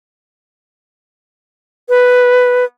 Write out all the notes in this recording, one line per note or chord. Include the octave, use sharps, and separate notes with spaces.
B4